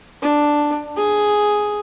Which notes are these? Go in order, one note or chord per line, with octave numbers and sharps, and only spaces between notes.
D4
G#4